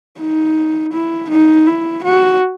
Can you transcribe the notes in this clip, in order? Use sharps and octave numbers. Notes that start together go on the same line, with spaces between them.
D#4
E4
D#4
E4
F#4